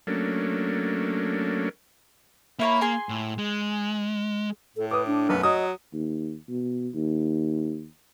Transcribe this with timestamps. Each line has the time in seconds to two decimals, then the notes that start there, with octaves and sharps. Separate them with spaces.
0.07 F#3 A3 A#3 C#4 D4
2.60 A#3 E4 C#5 B5
2.81 G#4 G#5 C6
3.09 A2
3.38 G#3
4.77 A2 A4
4.91 B4 D6 D#6
5.07 D4
5.29 B1 F#2 A3 B3
5.43 F#3 D#5 D#6
5.93 D#2
6.49 B2
6.94 D#2